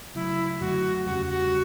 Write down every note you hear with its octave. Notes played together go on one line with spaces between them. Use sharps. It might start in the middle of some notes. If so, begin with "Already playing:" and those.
C#3 F#3 A3 E4
F#2 D3 F#3 A3 F#4
E2 C#3 G3 C#4 F#4 G4
F#4